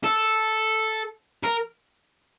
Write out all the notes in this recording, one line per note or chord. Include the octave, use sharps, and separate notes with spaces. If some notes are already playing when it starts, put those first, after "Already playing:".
A4
A#4